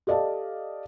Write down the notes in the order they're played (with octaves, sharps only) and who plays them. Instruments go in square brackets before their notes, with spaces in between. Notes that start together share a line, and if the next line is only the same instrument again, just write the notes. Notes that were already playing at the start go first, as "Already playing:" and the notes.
[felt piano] G4 A4 D5 D#5 F5 A5